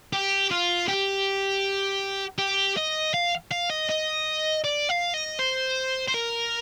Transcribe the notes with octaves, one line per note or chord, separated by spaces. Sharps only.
G4
F4
G4
G4
D#5
F5
F5
D#5
D#5
D5
F5
D#5
C5
C5
A#4